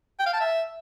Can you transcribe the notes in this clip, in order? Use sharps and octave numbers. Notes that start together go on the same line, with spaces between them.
G5
F5
A5
E5